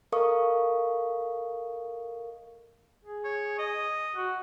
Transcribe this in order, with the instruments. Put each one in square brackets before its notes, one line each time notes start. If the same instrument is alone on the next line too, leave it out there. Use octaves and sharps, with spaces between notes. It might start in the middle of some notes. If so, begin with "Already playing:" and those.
[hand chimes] A4 A#4 D#5 F5 C#6 D#6
[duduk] G#4
[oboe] C#5
D#5
[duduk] F#4